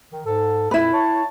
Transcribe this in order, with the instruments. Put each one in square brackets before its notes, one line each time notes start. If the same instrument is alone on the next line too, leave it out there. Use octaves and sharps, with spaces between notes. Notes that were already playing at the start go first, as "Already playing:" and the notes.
[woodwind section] D#3
G#2 A4
[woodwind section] F2 A#2 [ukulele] E4 B4
[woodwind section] C#5 A5